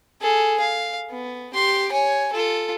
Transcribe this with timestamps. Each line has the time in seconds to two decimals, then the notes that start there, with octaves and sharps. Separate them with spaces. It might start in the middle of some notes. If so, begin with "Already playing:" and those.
0.21 G#4 A4
0.60 F5
1.10 B3
1.54 G4 C6
1.92 C#5 G#5
2.33 F4 A4